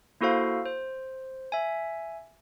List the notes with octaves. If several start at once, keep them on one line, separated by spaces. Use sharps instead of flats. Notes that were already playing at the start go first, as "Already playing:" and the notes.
A#3 E4 F#4 A4 C5 F5
C5
E5 G#5